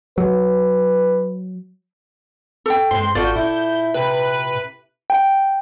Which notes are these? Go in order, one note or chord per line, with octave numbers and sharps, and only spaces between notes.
F#3 B4
A4 G5
G2 G#3 C4 C5 C6
G#1 F4 F#4 A4 D5 G6
A#2 E4
C3 B4
G5